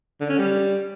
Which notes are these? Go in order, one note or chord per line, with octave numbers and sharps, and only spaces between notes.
D3
C#4
G3